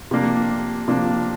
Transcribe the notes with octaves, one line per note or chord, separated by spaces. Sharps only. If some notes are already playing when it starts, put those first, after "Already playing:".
C3 F3 A#3 D4
C3 F3 A#3 D4